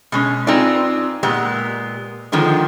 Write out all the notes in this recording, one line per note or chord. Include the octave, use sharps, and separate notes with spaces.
B2 G#3 C#4
C4 D#4 F4 G#4 B4 D5
A#2 G#3 B3 G4
D3 D#3 F3 G#3 B3